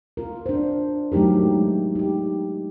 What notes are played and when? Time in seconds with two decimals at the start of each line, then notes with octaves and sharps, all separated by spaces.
0.17 F4 A#4
0.46 D4 C5
1.12 F#3 A3 D#4 G4 A#4
1.43 G#3
1.95 D#4 G4